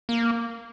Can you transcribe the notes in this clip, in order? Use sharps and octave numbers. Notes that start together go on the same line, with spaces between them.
A#3